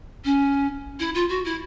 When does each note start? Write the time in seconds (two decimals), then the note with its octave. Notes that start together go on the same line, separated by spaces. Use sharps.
0.24 C#4
0.99 E4
1.14 F4
1.29 F#4
1.45 E4